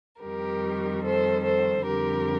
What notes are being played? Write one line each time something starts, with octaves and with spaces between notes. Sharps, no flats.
F2 D#3 G3 G4 A#4
A4 C5
A4 C5
F2 D3 G3 G4 A#4